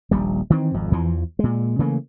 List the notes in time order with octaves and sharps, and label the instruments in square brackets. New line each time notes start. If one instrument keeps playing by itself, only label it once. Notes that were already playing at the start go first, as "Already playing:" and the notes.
[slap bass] D#1 A#1 G3
D#3 E3 C4
G#1 F2
E2 E3 F3
A#2 G#3
C#3 E3 A3 A#3